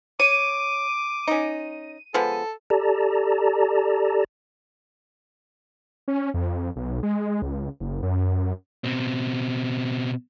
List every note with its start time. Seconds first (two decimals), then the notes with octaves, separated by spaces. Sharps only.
0.20 C#5 D6 D#7
1.27 C#4 D#4
2.14 F3 G#3 B3 A4
2.70 G4 A4 D5 A5 A#5
6.08 C#4
6.34 F2
6.76 B1
7.03 G#3
7.42 C#2
7.80 F#1
8.03 F#2
8.84 B2 C4